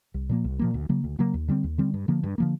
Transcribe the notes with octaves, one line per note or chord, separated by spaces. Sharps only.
C2
A#2 F3 A#3
C2
A#2 F3 A#3
D2
C#3 F#3 A#3
D2
C#3 F#3 A#3
D#2
D3 G3 C4
D#2
D3 G3 C4
G2
D3 F3 A#3
G2
D3 F3 A#3